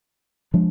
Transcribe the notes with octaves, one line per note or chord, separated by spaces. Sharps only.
F3 G#3 D4